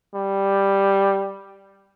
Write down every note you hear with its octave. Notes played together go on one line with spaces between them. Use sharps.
G3